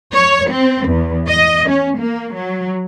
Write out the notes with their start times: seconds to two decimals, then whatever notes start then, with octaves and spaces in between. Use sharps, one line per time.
0.14 C#5
0.50 C4
0.87 E2
1.28 D#5
1.69 C#4
1.98 A#3
2.34 F#3